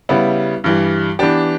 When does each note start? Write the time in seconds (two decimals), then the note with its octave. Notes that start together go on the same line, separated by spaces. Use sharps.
0.09 C#3 G3 B3 E4
0.64 G2 E3 G3
1.19 E3 B3 D4 G4